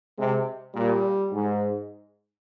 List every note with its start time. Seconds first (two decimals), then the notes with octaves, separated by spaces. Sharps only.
0.18 C3 G#3
0.74 A#2 G3
1.31 G#2